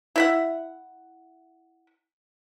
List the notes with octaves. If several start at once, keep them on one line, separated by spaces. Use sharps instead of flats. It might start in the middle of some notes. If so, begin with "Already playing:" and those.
E4 E5 F#5